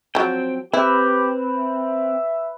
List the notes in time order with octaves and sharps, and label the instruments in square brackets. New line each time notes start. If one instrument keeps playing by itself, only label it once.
[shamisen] F3 F#3 [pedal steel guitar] C4 G5
[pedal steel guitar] C4 [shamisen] E4 [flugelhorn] G4 [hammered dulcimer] B4
[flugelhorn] E5